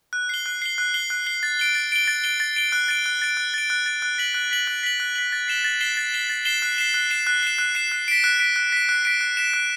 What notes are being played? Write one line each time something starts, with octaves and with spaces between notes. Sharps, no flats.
F#6
C7 G7
F#6
C7 G7
F#6
C7 G7
F#6
C7 G7
A6
D7 G7
A6
D7 G7
A6
D7 G7
A6
D7 G7
F#6
A6 D7
F#6
A6 D7
F#6
A6 D7
F#6
A6 D7
F#6
B6 F#7
F#6
B6 F#7
F#6
B6 F#7
F#6
B6 F#7
A6
C7 E7 G7
A6
C7 E7 G7
A6
C7 E7 G7
A6
C7 E7 G7
F#6
C7 E7
F#6
C7 E7
F#6
C7 E7
F#6
C7 E7
F#6
B6 D7
F#6
B6 D7
F#6
B6 D7
F#6
B6 D7
F#6
B6 E7
F#6